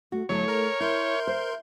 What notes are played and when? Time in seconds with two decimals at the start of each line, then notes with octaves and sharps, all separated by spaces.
0.12 A3 F#4
0.29 G1 F#3 A3 E4 A4 C#5
0.48 A#4 A#5
0.80 E4 A#4 E5 C6 G6
1.27 C5